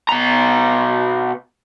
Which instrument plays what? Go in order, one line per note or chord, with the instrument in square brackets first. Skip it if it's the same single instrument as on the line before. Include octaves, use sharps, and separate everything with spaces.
[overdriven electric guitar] B2 A#5